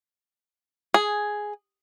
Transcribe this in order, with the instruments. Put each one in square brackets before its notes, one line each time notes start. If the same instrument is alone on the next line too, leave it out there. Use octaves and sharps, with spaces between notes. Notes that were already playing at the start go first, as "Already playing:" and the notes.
[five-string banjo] G#4